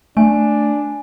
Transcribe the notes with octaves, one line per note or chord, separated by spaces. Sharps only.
A3 D4 G#5